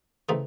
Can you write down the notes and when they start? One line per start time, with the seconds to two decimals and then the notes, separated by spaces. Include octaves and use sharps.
0.29 C#3 E3 A3 C4 D#4